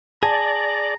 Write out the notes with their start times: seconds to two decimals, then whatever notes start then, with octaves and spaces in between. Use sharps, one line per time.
0.23 G#4 D5 A5 A#5